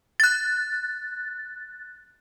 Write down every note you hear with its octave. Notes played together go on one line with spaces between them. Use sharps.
F#6 A6